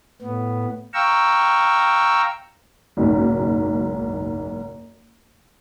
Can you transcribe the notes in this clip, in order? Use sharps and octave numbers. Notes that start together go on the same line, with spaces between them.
A2 B3
F5 G5 A#5 C#6 E6
F#1 B1 G#2